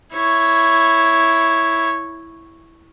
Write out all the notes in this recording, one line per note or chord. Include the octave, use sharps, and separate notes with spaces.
E4 C#5